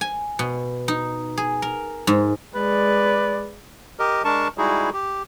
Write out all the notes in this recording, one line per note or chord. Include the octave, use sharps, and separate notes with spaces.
G#5
B2
D#4
G#4
A#4
G#2
G#3 B4 D5
G4 A#4 D#5
G#3 D4 A#4 A5 C#6
G3 G#3 D#4 E4 F#4 G#4
G4